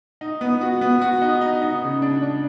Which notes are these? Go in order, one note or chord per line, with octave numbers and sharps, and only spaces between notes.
D#4
B3
F#4
B3
F#4
D#4
D#4
D#4
C#3
D4
D4